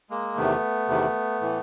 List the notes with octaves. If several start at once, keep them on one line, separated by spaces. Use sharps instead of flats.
G#3 A#3
E2 C3 D#3 A3 B3
E2 C3 D#3
A2 E3